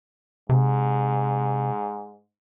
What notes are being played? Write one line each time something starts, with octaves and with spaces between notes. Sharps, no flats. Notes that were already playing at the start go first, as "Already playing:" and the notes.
G#2 C3